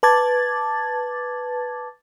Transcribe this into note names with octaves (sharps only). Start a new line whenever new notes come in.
B4 A5 D6 G#6 A6